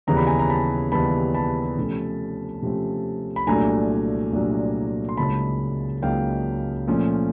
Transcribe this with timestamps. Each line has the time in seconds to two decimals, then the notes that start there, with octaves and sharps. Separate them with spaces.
0.07 D#2 C#3 E3 G3 B3 A#5
0.17 B5
0.27 G#5 A#5
0.39 A#5
0.49 A5 B5
0.92 D#2 C#3 E3 G3 B3 A5 B5
1.34 A5 B5
1.77 C3 F3 A3 C#4
2.62 C3 F3 A3 C#4
3.36 B5
3.47 C2 A#2 F#3 A3 D4 G#5 A#5
4.33 C2 A#2 F#3 A3 D4
5.09 C6
5.17 C#2 C#3 F#3 A#3 D#4 A5 B5
6.02 C#2 C#3 F#3 A#3 D#4 F5 G5
6.88 A#2 F3 A3 C#4 F4